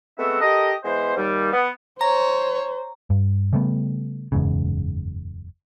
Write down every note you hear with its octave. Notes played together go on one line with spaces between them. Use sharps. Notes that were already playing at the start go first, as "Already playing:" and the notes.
G#3 A3 B3 C4 F#4 E5
G4 A4 A#4 D#5
E3 G#3 B3 C5
D#2 G3
B3
C5 C#5 A#5
G2
C#3 G3 A3 B3
F#1 E2 G#2 C#3